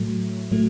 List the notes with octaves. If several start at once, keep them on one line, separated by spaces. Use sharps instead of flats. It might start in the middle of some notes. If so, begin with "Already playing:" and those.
Already playing: A2 F#3 A3
A2 F#3 A3